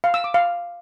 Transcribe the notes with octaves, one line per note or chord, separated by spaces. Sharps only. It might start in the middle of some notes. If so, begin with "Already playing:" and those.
F5
E6
D6
F5